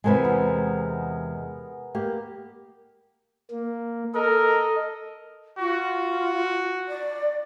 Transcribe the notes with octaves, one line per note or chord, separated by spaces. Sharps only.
E2 C3 G#3 G#4 A#4 B4
B3 A#4
A#3 G4
A#3
A4 A#4 D#5
F4 F#4
D5